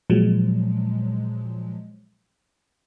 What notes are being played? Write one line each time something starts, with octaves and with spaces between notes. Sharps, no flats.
A#2 F3 F#3 G#3